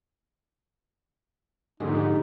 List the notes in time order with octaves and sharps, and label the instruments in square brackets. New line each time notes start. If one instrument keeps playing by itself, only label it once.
[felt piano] A#1 D3 G4 [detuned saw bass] G#2 [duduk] D#4